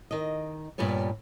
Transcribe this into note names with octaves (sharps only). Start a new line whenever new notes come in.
D#3 D#5
G2 A#2 G3 B3 C#5